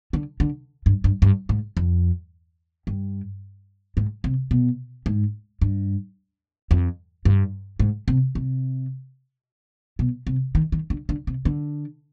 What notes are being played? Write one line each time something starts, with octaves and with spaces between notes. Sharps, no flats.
D3
D3
G2
G2
G2
G#2
F2
G2
G#2
C3
B2
G#2
G2
F2
G2
G#2
C3
C3
B2
C3
D#3
D#3
D3
D3
C3
D3